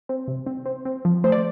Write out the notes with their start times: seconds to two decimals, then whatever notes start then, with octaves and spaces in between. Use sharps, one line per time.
0.09 C4
0.28 C3
0.47 C4
0.66 C4
0.85 C4
1.05 F3
1.24 A3 C5
1.32 D5